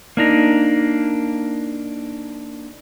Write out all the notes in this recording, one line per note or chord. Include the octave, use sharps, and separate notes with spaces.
A#3 D4 D#4